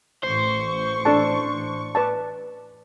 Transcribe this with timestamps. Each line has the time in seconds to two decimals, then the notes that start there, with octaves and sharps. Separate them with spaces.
0.23 A1 C5 C#6
1.05 D4 A4 A5
1.95 B4 D5 A5